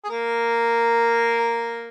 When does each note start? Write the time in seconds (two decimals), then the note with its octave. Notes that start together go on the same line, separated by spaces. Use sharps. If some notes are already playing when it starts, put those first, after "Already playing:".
0.04 G#4
0.10 A#3 A#4